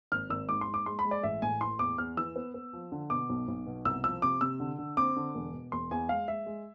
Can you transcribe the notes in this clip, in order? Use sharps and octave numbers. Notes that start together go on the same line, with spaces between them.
G#1 F6
G#1 E6
G#2 D6
C6
G#2
D6
G#3 C6
B5
G#3
D5
A1 E5
A2 G#5
E3 C6
E2 D6
E2 F6
E3 E6
B3
B3
F3
D3
B2 D6
B1
B1
B2
C2 E6
F3 E6
C3 D6
C3 E6
D3
D3
C4 D6
D3
E1
B2
E1 C6
E2 G#5
G#3 F5
G#3 E5
G#3